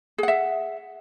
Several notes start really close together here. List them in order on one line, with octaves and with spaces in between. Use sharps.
G#4 F#5 E5